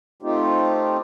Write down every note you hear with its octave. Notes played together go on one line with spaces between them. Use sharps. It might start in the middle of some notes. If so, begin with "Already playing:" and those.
A3 C4 D#4 F4 G4